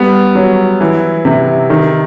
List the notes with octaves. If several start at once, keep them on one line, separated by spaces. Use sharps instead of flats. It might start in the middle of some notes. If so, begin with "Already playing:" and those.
Already playing: G3 B3
F#3
E3
C3
D#3